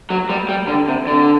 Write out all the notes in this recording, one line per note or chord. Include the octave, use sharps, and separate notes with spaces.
F#3
G3
G3
D3
C3
D3